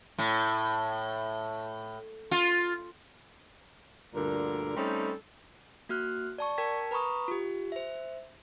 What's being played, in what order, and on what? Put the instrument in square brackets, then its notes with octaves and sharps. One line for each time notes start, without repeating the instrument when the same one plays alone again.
[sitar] A2
F4
[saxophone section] D2 G2 A#2 D3 A#4
G3 A3 C4 C#4 D#4 A4
[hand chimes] A#3 F#4 F6 F#6
D5 A5 C#6
A#4 G5 A5 G#6 B6
B4 A#5 B5 C#6 D#6
F4 G4
C5 E5